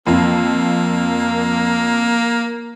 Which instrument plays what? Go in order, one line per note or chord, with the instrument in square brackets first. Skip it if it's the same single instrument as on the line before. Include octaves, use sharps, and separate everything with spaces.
[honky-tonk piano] F2 [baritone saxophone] A#3